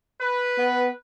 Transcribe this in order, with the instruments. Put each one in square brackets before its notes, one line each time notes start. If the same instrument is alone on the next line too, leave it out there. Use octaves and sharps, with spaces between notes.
[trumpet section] B4
[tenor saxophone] B3